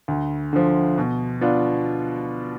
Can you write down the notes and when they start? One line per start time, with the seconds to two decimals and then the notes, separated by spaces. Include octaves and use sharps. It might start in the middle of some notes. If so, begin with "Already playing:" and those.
0.08 D2
0.53 D3 F3
0.98 B2
1.41 B3 D4 F4